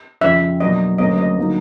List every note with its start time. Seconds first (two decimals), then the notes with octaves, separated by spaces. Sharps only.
0.21 F2 C#3 F3 E5
0.60 B2 F#3 A#3 D4 D#5
0.98 D2 C#3 F#3 A#3 C#4 D#5
1.18 D#5
1.38 D3 F#3 A#3 D#4